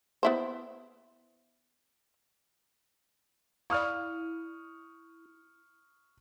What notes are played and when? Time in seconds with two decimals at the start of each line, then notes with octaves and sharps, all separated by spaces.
0.23 B3 E4 C5
3.70 E4 D5 F5 C#6 D#6 F6